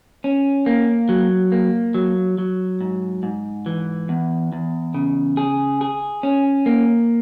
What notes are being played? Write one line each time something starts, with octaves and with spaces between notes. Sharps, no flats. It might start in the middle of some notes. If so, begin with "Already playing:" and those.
C#4
A#3
F#3
A#3
F#3
F#3
G#2
G#2
E3
E2
E2
C#3
G#4
G#4
C#4
A#3